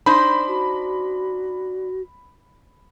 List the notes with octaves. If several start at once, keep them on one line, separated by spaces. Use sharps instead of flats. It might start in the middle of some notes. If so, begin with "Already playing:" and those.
D4 D#4 C5 B5
F#4